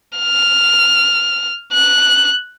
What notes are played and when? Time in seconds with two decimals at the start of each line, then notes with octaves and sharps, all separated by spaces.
0.18 F6
1.73 F#6